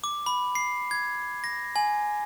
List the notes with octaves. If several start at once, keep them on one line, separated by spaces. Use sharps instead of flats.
D6
B5
C7
G#6
A#6
G#5